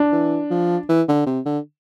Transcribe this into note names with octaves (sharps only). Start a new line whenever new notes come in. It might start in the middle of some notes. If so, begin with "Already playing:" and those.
Already playing: D4
E3
F3
E3
D3
C3
D3